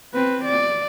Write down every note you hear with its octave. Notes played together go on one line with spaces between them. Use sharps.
C4 B4
D5